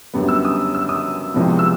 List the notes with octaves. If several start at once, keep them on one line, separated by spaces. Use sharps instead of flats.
F#2 D3 G3 B3
E6
D#6
E6
D#6
C2 C3 F3 G#3 B3
E6